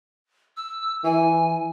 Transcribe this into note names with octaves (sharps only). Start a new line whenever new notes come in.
E6
E3 G#5